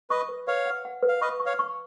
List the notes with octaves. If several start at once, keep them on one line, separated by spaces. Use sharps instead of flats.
B4 D#5 C#6
B4
B4 C#5 F5
F#5
F#5
B4
F5
B4 D#5 C#6
C#6
C#5 F5
C#6